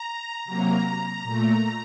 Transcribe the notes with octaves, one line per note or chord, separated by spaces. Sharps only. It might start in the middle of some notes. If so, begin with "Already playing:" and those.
Already playing: A#5
C3 F#3 A#3 A#5
A#2 A3